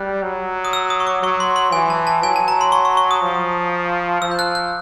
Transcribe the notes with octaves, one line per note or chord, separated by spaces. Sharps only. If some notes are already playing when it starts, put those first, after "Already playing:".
Already playing: G3 F#6
F#3
D#6
E6
D#6
C#6
D6
F#3 C#6
C6
C6
E3 G#5
A5
A5
F#3 G#5
A5
A#5
C6
C#6
C#6
C#6
D#6
F3
F3 E6
G6
F#6
F#6